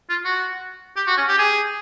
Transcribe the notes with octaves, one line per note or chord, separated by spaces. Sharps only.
F4
F#4
G4
F#4
C#4
G4
G#4